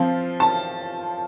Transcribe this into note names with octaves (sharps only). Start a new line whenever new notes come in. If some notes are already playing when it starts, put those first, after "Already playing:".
Already playing: F3 C4 F4
A5